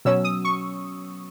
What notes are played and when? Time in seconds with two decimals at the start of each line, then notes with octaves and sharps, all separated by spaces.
0.05 B2 F#3 C#4 E6
0.24 D#6
0.45 C#6